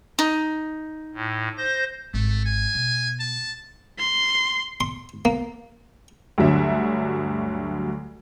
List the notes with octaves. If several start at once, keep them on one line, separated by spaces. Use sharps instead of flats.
D#4
A2
C5 G6 A#6
G#1 A3
G#5
B2
A5
C6
C6
A#3
D2 G2 D3 F#3 E5